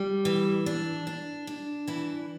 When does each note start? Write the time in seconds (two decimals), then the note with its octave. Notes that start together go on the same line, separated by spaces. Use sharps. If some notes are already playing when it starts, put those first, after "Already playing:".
Already playing: G3
0.25 E3
0.66 D4
1.07 D4
1.47 D4
1.87 E3 E4